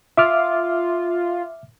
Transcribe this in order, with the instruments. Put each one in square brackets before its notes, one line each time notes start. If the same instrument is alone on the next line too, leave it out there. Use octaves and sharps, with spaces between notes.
[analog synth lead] F4 [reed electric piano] E5 D6 F6